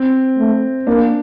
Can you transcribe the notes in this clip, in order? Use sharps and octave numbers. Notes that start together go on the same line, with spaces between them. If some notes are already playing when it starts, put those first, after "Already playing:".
Already playing: C4
A3
A#3 D4